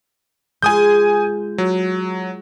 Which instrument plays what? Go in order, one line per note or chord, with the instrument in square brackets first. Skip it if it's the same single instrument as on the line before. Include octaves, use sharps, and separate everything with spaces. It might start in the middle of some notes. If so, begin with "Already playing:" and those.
[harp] G#3 F4 [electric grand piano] G#5 D#6 G6
[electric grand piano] F#3